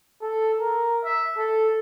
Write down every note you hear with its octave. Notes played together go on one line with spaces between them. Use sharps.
A4
A#4
E5
A4